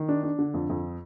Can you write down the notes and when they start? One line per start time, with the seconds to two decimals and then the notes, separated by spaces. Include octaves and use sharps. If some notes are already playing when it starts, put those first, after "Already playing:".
Already playing: D#3
0.09 D4
0.24 D4
0.39 D3
0.54 F2
0.69 F2